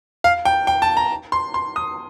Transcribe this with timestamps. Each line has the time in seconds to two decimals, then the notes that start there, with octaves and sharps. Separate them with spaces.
0.24 F5
0.45 G5
0.67 G5
0.82 A5
0.97 A#5
1.32 C6
1.54 C6
1.76 D#6